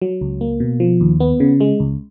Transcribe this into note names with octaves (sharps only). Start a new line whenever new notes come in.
F#3
C#2
A#3
B2
F3
D#2
B3
C#3
G#3
C#2